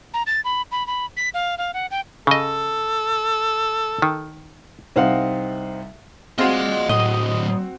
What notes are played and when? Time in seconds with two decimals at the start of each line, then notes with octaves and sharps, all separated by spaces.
0.14 A#5
0.27 A6
0.45 B5
0.72 B5
0.87 B5
1.17 B6
1.34 F5
1.58 F5
1.74 F#5
1.91 G5
2.27 C#3 A4 D#5
4.02 D#3
4.96 C2 C4 D#4 F5 F#5
6.38 C4 F4 F#4 G#4 D5 D#5 C6
6.89 A2 F#3 A3 D#5